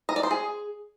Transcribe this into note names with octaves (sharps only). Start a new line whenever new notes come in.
D#5
D5
C5
G#4